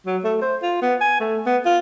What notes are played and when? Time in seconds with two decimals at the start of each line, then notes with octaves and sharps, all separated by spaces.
0.06 F#3
0.24 A3
0.42 C5
0.62 F4
0.82 B3
1.01 G#5
1.20 A3
1.46 B3
1.66 F4